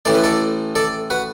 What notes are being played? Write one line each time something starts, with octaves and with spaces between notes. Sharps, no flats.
A1 A2 E3 A3 D5
B4
A4 D5
A4 D5
F#4 B4